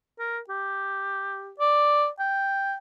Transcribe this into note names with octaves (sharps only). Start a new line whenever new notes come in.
A#4
G4
D5
G5